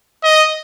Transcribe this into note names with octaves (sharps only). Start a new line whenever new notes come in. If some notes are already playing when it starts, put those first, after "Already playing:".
D#5